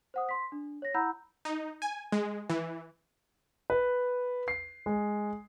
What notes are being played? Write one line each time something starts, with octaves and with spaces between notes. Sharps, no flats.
C5 F#5 D#6
C6 B6
D4
C#5 A#6
E4 F#5 A#5 B5 E6 G6
D#4
G#5
G#3
E3
B4
C7
G#3